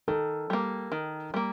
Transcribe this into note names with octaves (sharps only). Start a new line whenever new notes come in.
D#3 A4
G3 A#3
D#3
G3 A#3